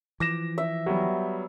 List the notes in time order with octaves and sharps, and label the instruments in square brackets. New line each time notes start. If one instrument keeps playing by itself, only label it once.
[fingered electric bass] E3 F3 [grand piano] D6 A#6 E7
[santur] E5
[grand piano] F#3 G3 B3